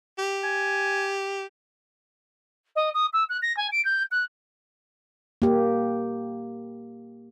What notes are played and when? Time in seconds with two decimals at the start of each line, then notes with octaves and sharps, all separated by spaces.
0.18 G4
0.44 G#5
2.75 D#5
2.94 D#6
3.13 E6
3.29 F#6
3.42 A#6
3.57 G#5
3.72 D7
3.85 G6
4.11 F#6
5.42 A#3 G4